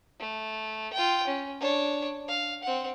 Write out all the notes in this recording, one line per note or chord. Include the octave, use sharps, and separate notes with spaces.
A3
F4 G5
C#4
D4 C#5
F5
C4 F#5